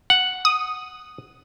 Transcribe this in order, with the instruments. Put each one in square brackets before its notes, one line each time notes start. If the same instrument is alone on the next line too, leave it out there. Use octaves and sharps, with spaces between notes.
[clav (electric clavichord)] F#5
[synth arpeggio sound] D#6